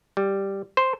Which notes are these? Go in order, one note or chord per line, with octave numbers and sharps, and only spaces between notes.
G3
C5